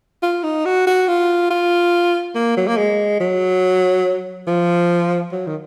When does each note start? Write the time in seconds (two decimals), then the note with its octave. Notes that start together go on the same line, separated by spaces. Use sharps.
0.22 F4
0.43 D#4
0.65 F#4
0.87 F#4
1.08 F4
1.50 F4
2.35 A#3
2.57 F#3
2.67 A#3
2.77 G#3
3.20 F#3
4.47 F3
5.32 F#3
5.47 D#3